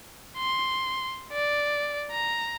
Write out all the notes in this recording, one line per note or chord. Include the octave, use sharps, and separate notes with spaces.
C6
D5
A#5